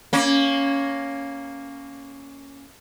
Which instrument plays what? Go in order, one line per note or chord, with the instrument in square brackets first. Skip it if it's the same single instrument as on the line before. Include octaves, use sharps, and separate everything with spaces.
[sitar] A#3 C#4